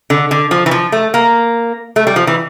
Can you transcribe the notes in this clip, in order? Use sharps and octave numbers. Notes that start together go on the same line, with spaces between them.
D3
D3
F3
E3
F3
A3
A#3
A3
G3
F3
E3